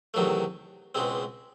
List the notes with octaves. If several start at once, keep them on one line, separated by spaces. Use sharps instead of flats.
E2 C3 D#3 F#3 A3
C#2 B2 G#3 C4